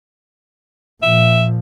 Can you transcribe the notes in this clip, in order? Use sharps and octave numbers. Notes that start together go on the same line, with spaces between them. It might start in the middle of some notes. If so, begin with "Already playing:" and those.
A#2 F3 E5